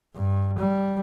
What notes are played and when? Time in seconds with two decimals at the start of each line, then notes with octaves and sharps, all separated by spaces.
0.15 G2
0.58 G3